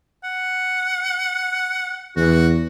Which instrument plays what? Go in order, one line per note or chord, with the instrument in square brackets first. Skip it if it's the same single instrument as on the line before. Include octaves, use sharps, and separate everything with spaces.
[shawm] F#5
[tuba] E2 [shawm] F#4